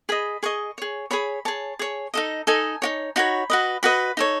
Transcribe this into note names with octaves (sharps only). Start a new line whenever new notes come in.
G#4 D#5 B5
G#4 D#5 C#6
G#4 C#5
G#4 C#5 B5
G#4 C#5 A5
G#4 C#5
D#4 A4 D#5
D#4 A4 D#5 G#5
D#4 F#4 C#5
D#4 F#4 C#5 B5
F#4 B4 D#5
F#4 B4 D#5 B5
D#4 A4 C#5